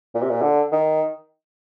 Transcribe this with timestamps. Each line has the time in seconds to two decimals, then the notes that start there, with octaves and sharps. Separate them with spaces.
0.15 A#2
0.22 C3
0.30 A#2
0.42 D3
0.72 D#3